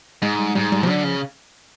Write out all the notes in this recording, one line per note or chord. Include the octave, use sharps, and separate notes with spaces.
G#2 G#3
G3
G#2 G3
G3
F3
D3 F#3
C#3 F3